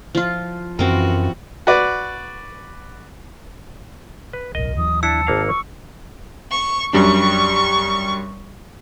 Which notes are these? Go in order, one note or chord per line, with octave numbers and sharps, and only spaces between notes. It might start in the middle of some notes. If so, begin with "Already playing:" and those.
F3 F4
F#2 E3 C4 F4 F#4 A#4
F#4 B4 D5
B4
D1 B1 A#4 D#5
D#2 E3 F#3 D#6
D4 E4 A5 E6 C#7
G#1 A#3 F5
C#6
C#6
F#2 G3 D4 C#6